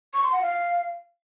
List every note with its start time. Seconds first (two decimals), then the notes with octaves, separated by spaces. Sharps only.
0.14 C#6
0.23 C6
0.32 F#5
0.42 F5